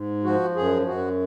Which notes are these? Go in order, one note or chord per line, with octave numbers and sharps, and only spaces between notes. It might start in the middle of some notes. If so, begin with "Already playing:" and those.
Already playing: G#2
F3 F#4
F#2 G#4
F#2 F#4